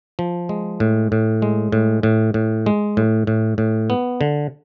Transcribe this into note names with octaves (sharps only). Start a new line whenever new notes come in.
F3
G#3
A2
A2
G#3
A2
A2
A2
G#3
A2
A2
A2
B3
D3